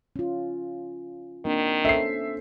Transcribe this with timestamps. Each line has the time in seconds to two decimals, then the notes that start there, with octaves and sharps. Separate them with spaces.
0.16 C#4 F4
1.45 D#3 A#3 C4 D4
1.85 C#4 A4 C5 E5 C7